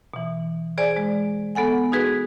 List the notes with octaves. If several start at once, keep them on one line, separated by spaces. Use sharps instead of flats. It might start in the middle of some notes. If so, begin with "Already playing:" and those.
B2 E3
G#4 C5 D5 G#5
G#3
B3 A4 F#5 G#5
D#4 F#4 G#4 B4